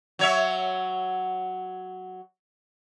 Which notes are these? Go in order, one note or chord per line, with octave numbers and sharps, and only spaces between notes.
F#3 C#5 E5